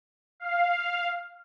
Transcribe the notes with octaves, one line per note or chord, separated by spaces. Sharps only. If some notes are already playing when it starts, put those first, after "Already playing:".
F5